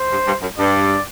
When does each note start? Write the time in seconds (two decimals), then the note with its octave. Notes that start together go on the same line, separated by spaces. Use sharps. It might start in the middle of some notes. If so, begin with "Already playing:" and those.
Already playing: C5
0.10 G2
0.26 G2
0.41 F#2
0.57 G2 D5